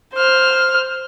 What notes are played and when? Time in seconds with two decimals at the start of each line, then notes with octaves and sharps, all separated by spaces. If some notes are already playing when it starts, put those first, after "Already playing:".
0.14 C5 F6